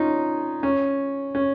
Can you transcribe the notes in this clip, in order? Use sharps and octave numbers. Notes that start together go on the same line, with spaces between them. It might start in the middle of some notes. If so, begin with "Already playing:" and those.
Already playing: C#4 D#4 F4
C#4
C#4